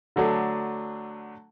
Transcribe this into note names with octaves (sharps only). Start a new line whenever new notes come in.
D3 F#3 A3 D4